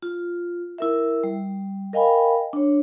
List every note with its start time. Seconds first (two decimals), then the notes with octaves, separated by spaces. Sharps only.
0.03 F4
0.78 E4 A#4 E5
1.24 G3
1.93 A#4 D#5 F5 G5 G#5 B5
2.53 D4 C#5